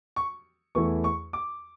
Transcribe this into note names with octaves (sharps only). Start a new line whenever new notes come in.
C#6
E2 E3 A3 E4 C#6
C#6
D6